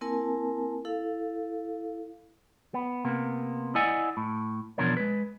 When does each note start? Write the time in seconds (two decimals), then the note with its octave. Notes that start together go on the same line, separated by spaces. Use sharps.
0.01 A#3 C4 E4 A#4 G#5 A5
0.85 E4 A4 F5
2.74 B3
3.05 C3 A#3 B3
3.75 E4 D5 D#5 F#5 G#5
4.17 A2
4.78 E2 B2 F3 D4 A#4 C#5
4.97 G#3 B4